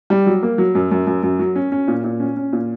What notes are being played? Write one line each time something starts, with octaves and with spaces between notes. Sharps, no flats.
G3
F#3
A#3
F#3
F#2
F#2
F#2
F#2
F#3
C#4
C#4
A#2
A#2
C#4
C#4
A#2